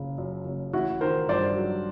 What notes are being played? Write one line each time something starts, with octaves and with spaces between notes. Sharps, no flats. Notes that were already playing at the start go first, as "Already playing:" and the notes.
Already playing: F#1 C#3
F#2
F#1
A1 E4 F#4
D#3 A#4 C5
G2 C5 D5
F#3